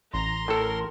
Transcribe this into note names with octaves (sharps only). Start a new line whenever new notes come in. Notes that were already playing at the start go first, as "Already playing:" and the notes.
A1 A#5 C6
A2 A4 A#4